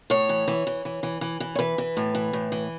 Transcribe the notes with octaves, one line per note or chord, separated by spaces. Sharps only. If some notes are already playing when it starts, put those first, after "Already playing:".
A2 C#5
E3
E3
E3
E3
E3
E3
E3
C#5
E3 B4
E3
A2
E3
A2
E3